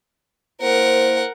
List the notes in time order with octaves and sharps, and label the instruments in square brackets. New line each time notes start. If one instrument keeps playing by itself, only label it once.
[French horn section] A#3 E4 C5 [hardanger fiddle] A#4 F#5